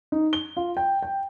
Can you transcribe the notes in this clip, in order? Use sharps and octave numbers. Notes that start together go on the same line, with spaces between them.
D#4
G7
F4
G5
G5